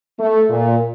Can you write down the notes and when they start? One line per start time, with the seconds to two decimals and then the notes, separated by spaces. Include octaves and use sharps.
0.20 A3
0.50 A#2